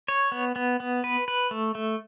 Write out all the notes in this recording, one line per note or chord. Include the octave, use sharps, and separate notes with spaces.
C#5
B3
B3
B3
B4
B4
A3
A3